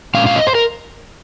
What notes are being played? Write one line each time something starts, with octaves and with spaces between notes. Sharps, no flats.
A#2 G#3 C#4 F5
F5
D#5
C5
A#4